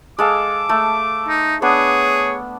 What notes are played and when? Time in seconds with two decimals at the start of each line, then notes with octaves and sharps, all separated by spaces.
0.19 G#3 A4 F5 D6
0.69 A3
1.28 D#4
1.62 B3 D4 G#4 C#5 D#6